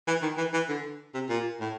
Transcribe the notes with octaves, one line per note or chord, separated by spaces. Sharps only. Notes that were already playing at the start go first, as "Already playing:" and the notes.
E3
D#3
E3
E3
D3
C3
A#2
A2